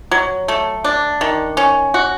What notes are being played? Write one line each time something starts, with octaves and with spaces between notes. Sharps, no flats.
F#3
A3
D4
D#3
C#4
F#4